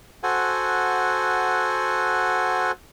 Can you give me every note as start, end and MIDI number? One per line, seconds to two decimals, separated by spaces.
0.23 2.72 66
0.23 2.72 69
0.23 2.72 72
0.23 2.72 78
0.23 2.72 80